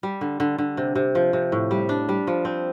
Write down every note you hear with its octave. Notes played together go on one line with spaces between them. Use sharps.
G3
D3
D3
D3
C3
C3
F3
C3
A2
G3
D4
G3
F3
C4